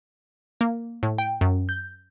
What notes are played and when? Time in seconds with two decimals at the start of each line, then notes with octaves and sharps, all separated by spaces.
0.61 A#3
1.03 A2
1.18 G5
1.41 F#2
1.69 G6